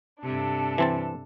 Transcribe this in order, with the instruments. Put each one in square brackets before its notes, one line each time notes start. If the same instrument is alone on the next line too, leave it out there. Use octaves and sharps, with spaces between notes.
[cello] G2 C3 [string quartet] D4 A4
[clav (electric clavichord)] E3 C4 A5